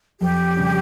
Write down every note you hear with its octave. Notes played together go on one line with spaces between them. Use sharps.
F2 G4
C#3 G3 C#4